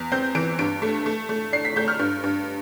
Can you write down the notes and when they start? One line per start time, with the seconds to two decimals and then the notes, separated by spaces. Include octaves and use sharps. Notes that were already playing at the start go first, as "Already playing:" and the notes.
Already playing: E2
0.12 C4 G6
0.35 E3 D7
0.59 G2 D7
0.82 A3
1.06 A3
1.29 A3
1.52 D4 C7
1.65 B6
1.76 A3 G6
1.88 F6
1.99 G2
2.23 G2